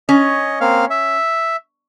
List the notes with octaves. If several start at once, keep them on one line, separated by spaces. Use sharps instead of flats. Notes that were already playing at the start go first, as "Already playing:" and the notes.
C#4 D#5
A#3 C4 F5
E5